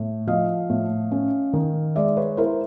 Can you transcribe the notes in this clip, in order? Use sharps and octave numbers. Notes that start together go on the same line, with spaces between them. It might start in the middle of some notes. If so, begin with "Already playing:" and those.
Already playing: A2
F3 D#5 F5
A2
C#4
D#3
G#3 D5 E5
B4 C#5
E4 A#4 C5